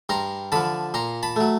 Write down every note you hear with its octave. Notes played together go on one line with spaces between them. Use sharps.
G2 A#5 C6
D3 F3 A5 B5
A#2 A#5 C6
A5 B5
F#3 A3